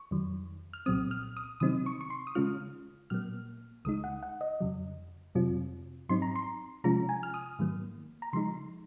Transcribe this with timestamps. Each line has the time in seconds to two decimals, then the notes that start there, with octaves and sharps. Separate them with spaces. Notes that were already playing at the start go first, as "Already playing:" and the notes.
Already playing: C#6
0.11 F2 D#3 F#3
0.73 F6
0.86 C2 A#2 F#3 C4 D#6
1.11 F6
1.37 D#6
1.60 C3 D#3 F#3 C4 D#4 D#6
1.86 C#6
2.01 C#6
2.10 C6
2.27 D#6
2.35 C#3 G#3 C#4 F4 F6
3.10 A#2 F#3 A#3 F6
3.85 C#2 C#3 G#3 D#4 D#6
4.04 F#5
4.23 F#5
4.41 D#5
4.60 F2 C#3 F#3
5.35 F2 C3 F#3 C4 F4
6.09 G#2 F#3 C4 D#4 C6
6.22 A#5
6.36 C6
6.84 C3 F3 G#3 C#4 F4 A#5
7.09 G#5
7.23 F6
7.34 D#6
7.59 G#2 D#3 F#3 A#3
8.22 A#5
8.33 C#3 F3 G#3 D#4 C6